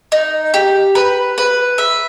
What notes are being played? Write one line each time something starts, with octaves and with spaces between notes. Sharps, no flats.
D#4
G4
B4
B4
E5